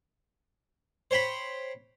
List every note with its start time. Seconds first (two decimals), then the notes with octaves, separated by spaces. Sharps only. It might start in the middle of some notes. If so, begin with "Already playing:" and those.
1.11 C5 C#5 G5 B5